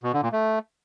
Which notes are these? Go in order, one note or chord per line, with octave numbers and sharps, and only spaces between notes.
B2
D3
A#2
A3